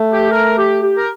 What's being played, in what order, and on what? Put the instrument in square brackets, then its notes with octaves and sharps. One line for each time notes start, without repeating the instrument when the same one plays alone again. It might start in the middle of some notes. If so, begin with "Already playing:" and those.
Already playing: [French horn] A3
[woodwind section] G4
A#4
G4
G4
A#4